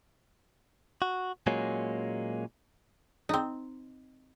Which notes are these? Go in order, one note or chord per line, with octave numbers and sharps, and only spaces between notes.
F#4
A#2 F#3 G#3 A#3 C#4
C4 D#4